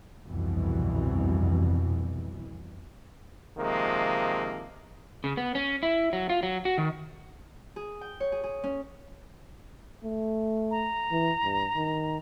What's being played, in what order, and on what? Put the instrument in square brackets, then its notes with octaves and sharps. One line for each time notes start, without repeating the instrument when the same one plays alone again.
[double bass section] G1 C2 F2 B2 E3
[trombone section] C3 D#3 F3 G#3 A#3
[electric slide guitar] C#3
B3
C#4
E4
F#3
F4
F#3
F#4
D#3
[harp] G#4
G5
C#5
G#4
G#4
C#4
[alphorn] A3
[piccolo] A#5
[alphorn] E3
G2
D#3